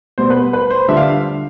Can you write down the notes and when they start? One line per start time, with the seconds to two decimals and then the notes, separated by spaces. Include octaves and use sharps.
0.18 B2 G3 B3 C5
0.30 B4
0.53 B4
0.70 C5
0.88 D3 G3 D4 F4 E5
0.97 F5